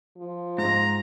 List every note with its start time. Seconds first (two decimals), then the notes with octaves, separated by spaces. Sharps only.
0.17 F3
0.58 G#2 A#5